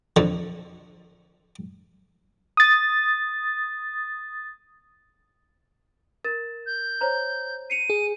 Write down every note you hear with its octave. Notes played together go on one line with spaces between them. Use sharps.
F2 D3
D#6 A6
A#4 A6 E7
G6
C5 C#5 A#5
C7 C#7 D#7 F7
G#4